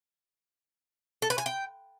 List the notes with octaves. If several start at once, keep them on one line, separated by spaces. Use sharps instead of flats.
A4
B4
G#5
G5